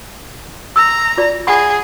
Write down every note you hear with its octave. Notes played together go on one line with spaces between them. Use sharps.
A#5 E6
F4 D5
G#4 F#5 B5